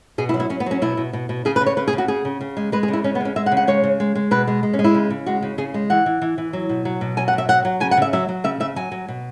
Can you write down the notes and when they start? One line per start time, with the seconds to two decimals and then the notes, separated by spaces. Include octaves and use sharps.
0.18 B2 G#4
0.29 E4
0.34 F#3
0.40 E4
0.50 F#3 C#4
0.60 B3
0.66 F#3 C#4
0.82 B2 E4
0.97 B2
1.13 B2
1.29 B2
1.45 C#3 G#4
1.56 B4
1.61 C#3
1.66 C#5
1.77 C#3 B4
1.88 G#4
1.93 C#3
1.98 F#4
2.08 C#3 G#4
2.25 C#3
2.41 C#3
2.57 G#3
2.72 G#3 B4
2.83 G#4
2.88 C#3
2.93 E4
3.04 G#3 C#4
3.15 B3
3.20 C#3 C#4
3.36 G#3 E5
3.46 F#5
3.52 C#3
3.57 F#5
3.67 G#3 C#5
3.84 C#3
4.00 G#3
4.15 G#3
4.31 B2 B4
4.47 G#3
4.63 G#3
4.73 C#4
4.79 G#3
4.84 E4
4.94 C#3
5.10 C#3
5.26 G#3 F#4
5.42 C#3
5.58 C#3 G#4
5.74 G#3
5.90 E3 F#5
6.06 E3
6.22 E3
6.38 E3
6.53 F#3
6.69 B2
6.85 F#3
7.01 B2
7.17 F#3 G#5
7.28 F#5
7.33 B2
7.38 E5
7.49 F#3 F#5
7.65 F#3
7.80 C#3 G#5
7.91 F#5
7.97 C#3 E5
8.13 F#3 E5
8.29 F#3
8.44 C#3 E5
8.60 C#3 E5
8.76 F#3 G#5
8.92 F#3
9.08 B2